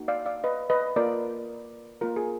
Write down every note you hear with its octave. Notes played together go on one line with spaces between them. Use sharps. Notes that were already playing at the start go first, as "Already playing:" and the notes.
Already playing: A#3 D#4 F#4
D5 F5
D5 F5
B4 D#5
B4 D#5
A#3 F4 A#4 D5
A#3 F4 A#4
G#4